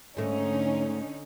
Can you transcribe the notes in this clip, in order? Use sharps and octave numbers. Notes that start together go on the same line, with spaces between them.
G#2 D3 A3 C#4 D#4